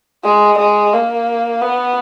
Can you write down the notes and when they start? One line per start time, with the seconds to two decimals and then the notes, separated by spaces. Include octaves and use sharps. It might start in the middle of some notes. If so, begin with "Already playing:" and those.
0.24 G#3
0.58 G#3
0.93 A#3
1.61 B3